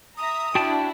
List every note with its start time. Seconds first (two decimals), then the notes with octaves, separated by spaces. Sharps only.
0.17 E5 A#5 D#6
0.55 D4 E4 F#4 G5 A5